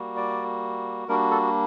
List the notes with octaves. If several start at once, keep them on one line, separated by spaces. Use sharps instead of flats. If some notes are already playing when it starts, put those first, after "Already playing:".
Already playing: G3 A#3 F#4
D5
G3 A#3 D4 F#4 A#4
A4